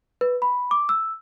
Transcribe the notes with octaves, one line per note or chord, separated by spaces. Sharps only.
B4
B5
D6
E6